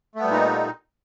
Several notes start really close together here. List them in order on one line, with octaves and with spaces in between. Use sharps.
A3 B3 G3 A#2 D#4